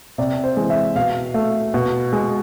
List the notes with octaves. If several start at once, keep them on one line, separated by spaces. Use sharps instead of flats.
C3 D5
C5
E3 G#3
E5
B2 F5
A3
B2
G#3